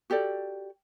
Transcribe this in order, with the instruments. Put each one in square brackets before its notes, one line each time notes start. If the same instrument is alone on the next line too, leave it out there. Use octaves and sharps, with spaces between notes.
[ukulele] F#4 G4 A4 D5